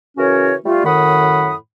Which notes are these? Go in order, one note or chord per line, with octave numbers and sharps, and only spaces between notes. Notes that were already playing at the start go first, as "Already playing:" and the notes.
C#3 E3 C#4 F#4 A#4 C#5
G3 A3 F4
F#2 A2 D#3 F#5 B5 D#6